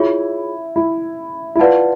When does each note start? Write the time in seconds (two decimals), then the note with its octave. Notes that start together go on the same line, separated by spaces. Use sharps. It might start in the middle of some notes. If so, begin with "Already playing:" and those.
Already playing: E4 F4 G#4 C#5
0.76 E4
1.55 E4
1.59 F4 B4 D5 F#5 A5